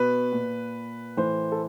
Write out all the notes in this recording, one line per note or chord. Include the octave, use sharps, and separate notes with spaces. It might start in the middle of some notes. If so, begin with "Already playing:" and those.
Already playing: B2 B4
A#2
A2 E3 C5
A4